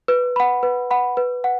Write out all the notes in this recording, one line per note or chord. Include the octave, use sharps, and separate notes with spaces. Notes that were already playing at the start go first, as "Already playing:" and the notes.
B4
F#5 B5
B4
F#5 B5
B4
F#5